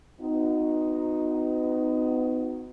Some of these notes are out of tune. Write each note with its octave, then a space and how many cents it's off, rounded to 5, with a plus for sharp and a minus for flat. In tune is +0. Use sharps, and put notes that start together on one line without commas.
B3 +40 D#4 -5 F#4 -25